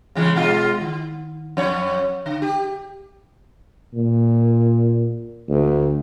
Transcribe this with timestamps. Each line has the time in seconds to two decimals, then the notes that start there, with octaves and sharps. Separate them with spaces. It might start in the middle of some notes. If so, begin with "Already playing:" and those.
0.15 C#3 E3 G#3
0.36 B2 G#3 F4
0.81 D#3
1.57 F2 C#5
2.26 D3
2.42 G4
3.94 A#2
5.49 D2